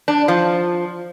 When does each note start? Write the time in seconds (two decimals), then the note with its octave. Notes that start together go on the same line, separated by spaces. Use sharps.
0.08 D4
0.28 F3